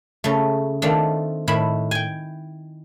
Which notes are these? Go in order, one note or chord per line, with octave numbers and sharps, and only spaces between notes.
C#3 A3
D#3 A3 C4 D4 F4
A2 D#3 E4 B5
G5 G#5